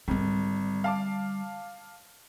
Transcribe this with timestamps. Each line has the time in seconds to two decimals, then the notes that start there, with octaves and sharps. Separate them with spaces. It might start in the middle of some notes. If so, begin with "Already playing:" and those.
0.08 G#1 D3 G3
0.84 F5 A5 D6